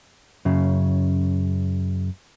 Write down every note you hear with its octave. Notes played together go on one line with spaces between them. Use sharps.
F#2 C#3